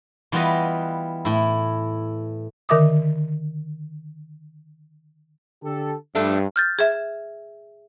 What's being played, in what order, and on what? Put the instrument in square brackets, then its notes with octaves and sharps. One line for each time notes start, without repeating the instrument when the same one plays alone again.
[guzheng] E3 G3 B3 F4 B4 D#5
A2 E4
[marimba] D3 D#3 A#4 E5 D6 D#6
[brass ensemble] D3 G4 A4
[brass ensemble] G2 [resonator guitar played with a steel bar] F3 A3 D4
[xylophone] F6 G6 A6
[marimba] G#4 E5